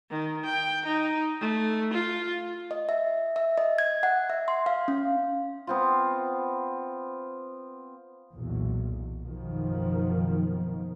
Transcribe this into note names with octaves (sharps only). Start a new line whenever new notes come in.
D#3
G5
D#4
A3
F4
D#5
E5
E5
D#5
G#6
F#5
E5
C6
F5
C#4
B3 C4 F4
B1 E2 A#2
F#1 B2 D#3 F3